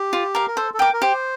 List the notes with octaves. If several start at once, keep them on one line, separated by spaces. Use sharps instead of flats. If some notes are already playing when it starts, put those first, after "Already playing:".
Already playing: G4
F4
A#4 F5
A#4
A4 C5
A4
A#4 G5 D6
A#4
G4 C5